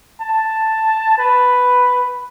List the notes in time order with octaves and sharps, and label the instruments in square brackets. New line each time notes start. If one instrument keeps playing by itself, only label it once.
[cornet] A5
B4